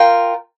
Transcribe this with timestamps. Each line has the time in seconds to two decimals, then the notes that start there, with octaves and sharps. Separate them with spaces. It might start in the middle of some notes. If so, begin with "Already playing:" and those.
Already playing: F4 A#4 G5